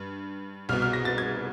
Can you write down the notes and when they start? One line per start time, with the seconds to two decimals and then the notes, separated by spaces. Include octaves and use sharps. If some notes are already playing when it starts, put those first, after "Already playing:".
Already playing: G2
0.69 C2 B2 F6
0.82 F6
0.93 A#6
1.05 A6
1.18 G#6